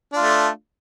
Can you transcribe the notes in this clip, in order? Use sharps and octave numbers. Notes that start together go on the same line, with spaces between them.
A3 D4 F4